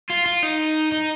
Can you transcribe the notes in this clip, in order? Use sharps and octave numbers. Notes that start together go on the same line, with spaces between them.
F4
F4
D#4
D#4